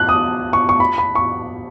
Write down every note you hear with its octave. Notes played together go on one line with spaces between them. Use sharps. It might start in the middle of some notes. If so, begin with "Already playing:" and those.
Already playing: F#6
D#6
C#6
C#6
B5
B5
C#6